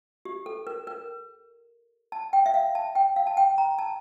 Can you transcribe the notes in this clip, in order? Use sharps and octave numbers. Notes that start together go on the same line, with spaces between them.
G4
A4
A#4
A#4
A5
G5
E5
F5
A5
G5
F5
A5
G5
A#5
A5